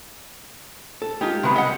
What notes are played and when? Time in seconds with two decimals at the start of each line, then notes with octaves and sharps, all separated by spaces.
1.02 A4
1.21 G#3 D#4 F4 G4
1.43 C3 F#3 B3
1.56 G3 D#5 F#5 B5